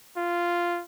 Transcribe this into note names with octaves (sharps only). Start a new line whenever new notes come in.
F4